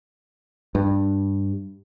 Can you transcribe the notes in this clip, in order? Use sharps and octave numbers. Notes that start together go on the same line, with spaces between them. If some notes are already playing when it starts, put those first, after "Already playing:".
G2